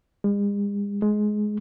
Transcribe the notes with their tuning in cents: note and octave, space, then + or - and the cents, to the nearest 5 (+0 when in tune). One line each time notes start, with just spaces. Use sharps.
G#3 -45
G#3 +15